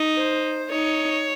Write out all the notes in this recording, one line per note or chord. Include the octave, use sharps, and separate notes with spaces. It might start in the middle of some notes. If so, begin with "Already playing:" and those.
Already playing: D#4
C5
D#4 C#5